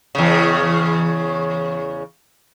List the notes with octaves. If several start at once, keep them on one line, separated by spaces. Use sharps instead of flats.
E2 C#3